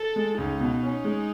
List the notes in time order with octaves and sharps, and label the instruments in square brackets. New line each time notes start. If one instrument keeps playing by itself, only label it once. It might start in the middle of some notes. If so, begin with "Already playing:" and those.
Already playing: [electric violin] A4
[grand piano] G#3
[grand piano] C#2 [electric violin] D#4
[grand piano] B2
C#4
G#3